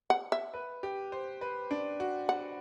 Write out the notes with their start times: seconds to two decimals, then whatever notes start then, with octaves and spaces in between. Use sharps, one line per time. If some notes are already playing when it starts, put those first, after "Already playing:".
0.10 F#5
0.32 E5
0.54 B4
0.83 G4
1.12 C5
1.41 B4
1.71 D4
2.00 F#4
2.29 F#5